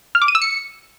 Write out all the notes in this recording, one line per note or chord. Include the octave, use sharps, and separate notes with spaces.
F6
D6
D#7
E6
C#7